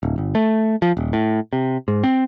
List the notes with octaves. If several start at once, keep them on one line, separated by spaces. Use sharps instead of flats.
D1
G1
A3
F3
D#1
A2
C3
G#2
C4